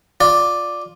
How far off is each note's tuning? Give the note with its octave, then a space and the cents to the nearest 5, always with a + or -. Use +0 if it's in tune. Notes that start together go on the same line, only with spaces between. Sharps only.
F4 +15 D5 +0